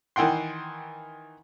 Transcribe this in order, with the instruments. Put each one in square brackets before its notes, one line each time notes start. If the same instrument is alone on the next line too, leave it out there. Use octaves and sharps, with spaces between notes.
[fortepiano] D#3 E3 F#5 G5 C6